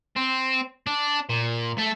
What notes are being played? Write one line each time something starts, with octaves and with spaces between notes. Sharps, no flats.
C4
D4
A#2
A3 A4